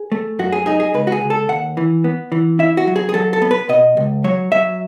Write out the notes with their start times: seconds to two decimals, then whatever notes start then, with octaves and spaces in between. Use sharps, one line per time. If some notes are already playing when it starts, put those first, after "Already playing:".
Already playing: G#4
0.12 A3
0.39 F#2 F#4
0.52 G#4
0.66 D#4 G#4
0.80 G#4
0.94 C#2 B4
1.07 F#4
1.12 G#4
1.21 C#2
1.30 A4
1.49 D#2 F#5
1.77 E3
2.04 B3
2.32 E3
2.59 E4 E5
2.77 F#4
2.87 F#3
2.96 G#4
3.09 G#4
3.14 F#3 A4
3.33 A4
3.42 B3
3.51 B4
3.69 B2 D#5
3.97 C#2
4.24 F#3 C#5
4.52 F#3 E5